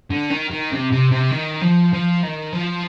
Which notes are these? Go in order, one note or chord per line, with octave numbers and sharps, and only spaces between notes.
D3
D#3
D#3
C3
C3
C3
D#3
F3
F3
D#3
F3